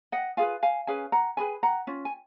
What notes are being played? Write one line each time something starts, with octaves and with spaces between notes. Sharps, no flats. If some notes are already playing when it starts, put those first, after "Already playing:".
D#5 F#5
F4 G#4 B4 F5 G#5
F5 G#5
C#4 G#4 B4 F5 G#5
F#5 A#5
C#4 G#4 B4 G#5 B5
F#5 A#5
C#4 F4
G#5